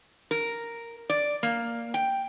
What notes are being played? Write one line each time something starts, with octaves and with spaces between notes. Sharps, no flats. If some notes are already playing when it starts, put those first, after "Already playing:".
A#4
D5
A#3
G5